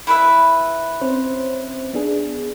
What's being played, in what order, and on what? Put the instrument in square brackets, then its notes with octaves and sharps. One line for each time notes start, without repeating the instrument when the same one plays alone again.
[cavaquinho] E4 B4 E5
[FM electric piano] C4 C#4 C5
B3 D4 G#4